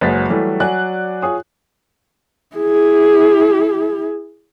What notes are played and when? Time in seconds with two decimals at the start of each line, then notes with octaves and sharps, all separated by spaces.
0.01 F#1 F#3 G#3 B4 A6 B6
0.30 E3 F#3 G3 A3
0.60 F#3 D5 G#5 F#6
1.22 F4 G#4 C#5 D#6
2.56 E4 G#4